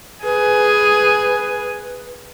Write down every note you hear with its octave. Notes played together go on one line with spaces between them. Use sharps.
G#4 B4